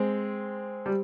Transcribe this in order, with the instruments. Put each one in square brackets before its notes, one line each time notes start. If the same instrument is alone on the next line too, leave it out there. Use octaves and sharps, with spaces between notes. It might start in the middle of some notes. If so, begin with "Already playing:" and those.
Already playing: [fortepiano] G#3 C4
G3